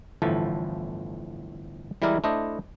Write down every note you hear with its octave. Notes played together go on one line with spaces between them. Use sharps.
G1 A2 E3 F3 A4
E3 G3 G#3 E4 A#4 D5
A3 D4 E4 C5 D#5